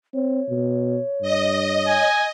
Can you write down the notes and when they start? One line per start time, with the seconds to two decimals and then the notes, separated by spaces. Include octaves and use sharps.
0.14 C4 C#5
0.49 B2
1.22 G2 D#5
1.88 G#5